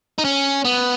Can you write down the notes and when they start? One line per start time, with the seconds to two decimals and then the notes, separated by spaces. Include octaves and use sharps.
0.18 D#4
0.25 C#4
0.65 B3